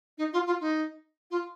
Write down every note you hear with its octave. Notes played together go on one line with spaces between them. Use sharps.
D#4
F4
F4
D#4
F4